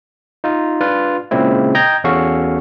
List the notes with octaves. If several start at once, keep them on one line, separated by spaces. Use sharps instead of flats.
D#4 F4
D4 F4 B4
A#2 C#3 G#3 C4 E4
D#5 G5 A#5 G6 G#6 A#6
E2 C#4 F#4 A4 F5 C#6